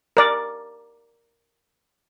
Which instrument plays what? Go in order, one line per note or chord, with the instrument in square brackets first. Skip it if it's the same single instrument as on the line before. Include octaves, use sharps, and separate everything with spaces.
[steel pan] A#4 D5